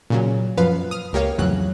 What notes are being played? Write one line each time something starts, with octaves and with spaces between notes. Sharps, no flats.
A#2 C#3 F#3
F#2 F3 B3 B4 F5
D#6 F6
C#2 A#3 G4 C#5 F5
A1 F2 C#3 F#3 F#6